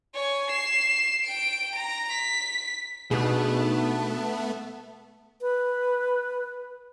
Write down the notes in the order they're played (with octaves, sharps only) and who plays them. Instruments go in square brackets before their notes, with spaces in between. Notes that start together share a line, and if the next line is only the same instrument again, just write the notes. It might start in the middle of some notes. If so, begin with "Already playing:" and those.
[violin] C#5 G#5
C7 E7
G5 D7
A#5
B6
[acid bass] B2 [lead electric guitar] A3 [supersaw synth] B3 [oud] D4 D#4 G#4
[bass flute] B4